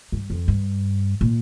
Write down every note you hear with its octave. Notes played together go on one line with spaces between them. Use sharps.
G2
F2
G2
A#2